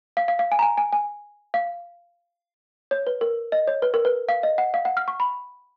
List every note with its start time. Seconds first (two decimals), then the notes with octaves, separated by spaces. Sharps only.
0.17 F5
0.28 F5
0.39 F5
0.52 G#5
0.59 A#5
0.62 G#5
0.78 G#5
0.93 G#5
1.54 F5
2.91 C#5
3.07 B4
3.21 A#4
3.52 D#5
3.67 C#5
3.82 B4
3.94 A#4
4.05 B4
4.29 F5
4.43 D#5
4.58 F#5
4.74 F5
4.85 F#5
4.97 F6
5.08 C#6
5.20 B5